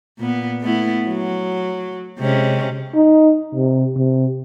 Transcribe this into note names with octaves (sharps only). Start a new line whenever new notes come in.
A#2 B3
A3 B3 E4
F#3
C3 G#3 C#4
D#4
C3
C3